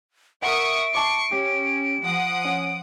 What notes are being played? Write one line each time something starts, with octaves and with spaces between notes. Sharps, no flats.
A#4 E5 F#5 C#6 D#6 D7
A5 C#6 D6 C7
C#4 G4
F3 F#5 D#6
C#4